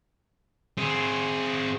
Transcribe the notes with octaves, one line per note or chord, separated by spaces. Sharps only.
C4 G#4